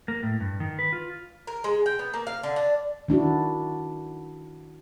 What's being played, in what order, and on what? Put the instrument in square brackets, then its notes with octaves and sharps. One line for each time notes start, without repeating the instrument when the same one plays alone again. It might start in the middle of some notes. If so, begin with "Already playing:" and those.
[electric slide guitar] A#3
A2
G2
D#3
B4
F4
[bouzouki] A#4
G#3
G5
B3
A#3
F5
D3
D4
[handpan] D#3 D4 E4 F#4